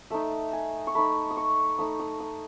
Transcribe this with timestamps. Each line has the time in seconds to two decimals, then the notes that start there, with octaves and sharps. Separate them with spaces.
0.10 A3 D#4 E5
0.53 G#5
0.87 C#6
0.95 A3 D#4 B5
1.31 D#6
1.37 C#6
1.79 A3 D#4 D#6
1.99 D#6
2.20 D#6